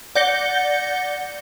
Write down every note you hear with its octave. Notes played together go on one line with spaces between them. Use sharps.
D5 F#5 G6 A#6 C#7 G7